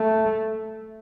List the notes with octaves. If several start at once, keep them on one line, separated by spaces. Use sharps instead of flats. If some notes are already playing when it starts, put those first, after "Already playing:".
Already playing: A3